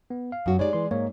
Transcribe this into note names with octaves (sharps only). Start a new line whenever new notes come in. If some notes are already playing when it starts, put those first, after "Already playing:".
B3
F5
F#2 F#4
G#3 D#4 G4 C#5 D5
E3 C6
G#2 G#3 A#3 C#5